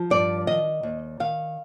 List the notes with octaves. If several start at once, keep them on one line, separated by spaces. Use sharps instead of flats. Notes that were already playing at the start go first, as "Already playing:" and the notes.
Already playing: F3
G2 D5
D#3 D#5
D#2
D#3 F5